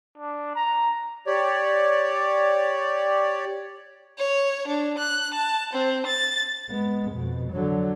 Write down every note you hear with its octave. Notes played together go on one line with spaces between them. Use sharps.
D4
A#5
G4 C#5 D5
C#5
D4
F#6
A5
C4
A6
G#3 B3
F2 B2
D3 F#3